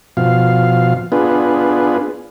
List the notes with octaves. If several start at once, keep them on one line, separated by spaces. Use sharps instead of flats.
B2 F3 F5
B3 D4 F4 G#4 B4